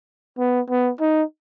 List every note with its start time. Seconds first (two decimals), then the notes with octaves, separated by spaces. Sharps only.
0.39 B3
0.70 B3
1.01 D#4